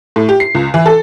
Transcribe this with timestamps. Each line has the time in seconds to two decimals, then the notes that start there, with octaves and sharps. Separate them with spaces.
0.16 A2
0.29 G4
0.40 C7
0.55 C#2
0.74 E3
0.86 A4